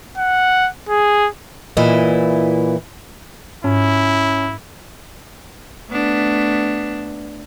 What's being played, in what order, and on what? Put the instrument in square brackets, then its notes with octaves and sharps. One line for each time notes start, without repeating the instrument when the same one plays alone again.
[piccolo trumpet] F#5
G#4
[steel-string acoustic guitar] A#2 E3 E4 D#5
[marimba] G#2 [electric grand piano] C#4 [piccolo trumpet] E4
[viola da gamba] A3 B3 D4